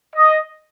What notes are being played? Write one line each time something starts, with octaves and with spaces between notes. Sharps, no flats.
D#5